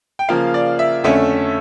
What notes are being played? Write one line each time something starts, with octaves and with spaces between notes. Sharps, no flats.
G5
C#3 F3 A#3 F5
D5
E5
F2 D3 A3 C#4 E5